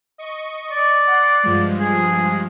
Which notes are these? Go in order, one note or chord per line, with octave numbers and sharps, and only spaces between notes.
D#5 C#6
D5
F#5 C6
G2 F3 G#3
G#4